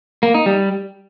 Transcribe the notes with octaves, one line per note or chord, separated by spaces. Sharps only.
A#3
D#4
G3